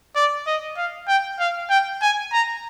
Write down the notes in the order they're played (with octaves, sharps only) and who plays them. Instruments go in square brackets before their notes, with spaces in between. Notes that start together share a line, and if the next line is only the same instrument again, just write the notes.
[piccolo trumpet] D5
D#5
F5
G5
F5
G5
G#5
A#5